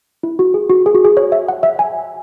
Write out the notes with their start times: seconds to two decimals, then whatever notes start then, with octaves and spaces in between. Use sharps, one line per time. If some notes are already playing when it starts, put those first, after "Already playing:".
0.23 E4
0.39 F#4
0.54 G#4
0.70 F#4
0.86 G#4
0.95 F#4
1.05 G#4
1.17 C#5
1.32 E5
1.48 F#5
1.63 E5
1.79 G#5